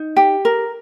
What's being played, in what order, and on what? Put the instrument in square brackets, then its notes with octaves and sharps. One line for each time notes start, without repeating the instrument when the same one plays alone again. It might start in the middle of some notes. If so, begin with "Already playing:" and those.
Already playing: [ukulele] D#4
G4
A#4